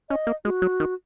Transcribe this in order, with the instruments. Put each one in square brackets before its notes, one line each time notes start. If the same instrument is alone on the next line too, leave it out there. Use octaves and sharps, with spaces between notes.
[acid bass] C#4 [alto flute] D#5
[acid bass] A#3
[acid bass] G#3 [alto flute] F#4
[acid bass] F#3
D#3